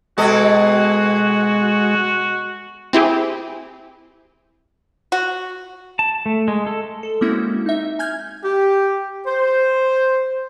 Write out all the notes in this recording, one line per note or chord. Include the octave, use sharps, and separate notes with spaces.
B2 G#3 F#4 A4 D#5
C4 E4 G4 G#4
F#4
A5
A3
G#3
A4
A4
G#3 A#3 C4 C#4 E4 F#4
D#4 E5
G#5 F6 G6 G#6
G4
C5